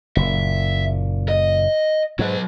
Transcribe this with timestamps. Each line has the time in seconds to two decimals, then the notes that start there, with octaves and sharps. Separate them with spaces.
0.16 F#1 A#2 E5
1.29 D#5
2.19 G#2 F#3 B4